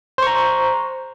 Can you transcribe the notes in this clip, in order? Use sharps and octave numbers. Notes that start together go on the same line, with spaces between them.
C5 A#5 C#6